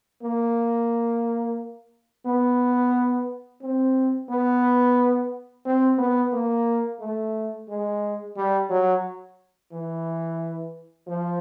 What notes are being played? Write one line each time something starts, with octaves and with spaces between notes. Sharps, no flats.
A#3
B3
C4
B3
C4
B3
A#3
A3
G#3
G3
F#3
E3
F3